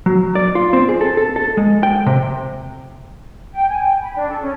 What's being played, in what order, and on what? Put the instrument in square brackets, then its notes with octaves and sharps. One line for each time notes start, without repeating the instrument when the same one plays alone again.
[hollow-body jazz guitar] F#3
D5
F4
C4
G#4
A4
A4
A4
G#3
G5
C3
[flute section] G5
G#5
G5
B5
D4
A4
C#4